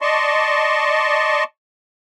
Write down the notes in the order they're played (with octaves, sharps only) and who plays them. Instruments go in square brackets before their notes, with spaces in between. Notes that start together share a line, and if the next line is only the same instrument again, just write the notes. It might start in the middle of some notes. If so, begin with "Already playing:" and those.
[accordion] D5 D#5 A5 C6 C#6